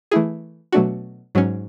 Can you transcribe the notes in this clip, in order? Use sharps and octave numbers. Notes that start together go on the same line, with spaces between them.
E3 A3 E4 G#4
B2 F#3 A3 D4 F#4
G#2 F#3 C#4